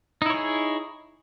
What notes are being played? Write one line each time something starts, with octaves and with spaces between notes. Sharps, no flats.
D#4 E4 G#4 C#5